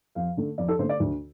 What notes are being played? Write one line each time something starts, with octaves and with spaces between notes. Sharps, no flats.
F2 F5
D3 A3
F2 D5
A4
D3 A3 C5
D5
D2